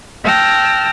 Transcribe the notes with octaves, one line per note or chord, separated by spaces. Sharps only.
G5 A5 E6 F6 A#6